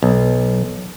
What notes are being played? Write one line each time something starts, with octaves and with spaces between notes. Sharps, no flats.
B1